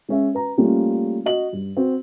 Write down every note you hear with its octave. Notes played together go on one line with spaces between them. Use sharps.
G#3 C#4 E5
B4 A#5
G3 A3 A#3 C#4 F4
F#4 D#5 F#7
G2
C4 F#4